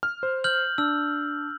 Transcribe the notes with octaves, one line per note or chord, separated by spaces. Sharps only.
F6
C5
F6 G6 F#7
D4 E6